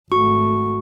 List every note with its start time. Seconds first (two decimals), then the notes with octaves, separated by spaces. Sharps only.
0.12 G#1 A3 F#4 C#6